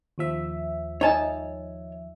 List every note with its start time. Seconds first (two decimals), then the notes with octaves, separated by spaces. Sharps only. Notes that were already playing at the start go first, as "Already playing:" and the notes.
0.18 D#2 F3 E5
1.01 D#4 C#5 G#5 A5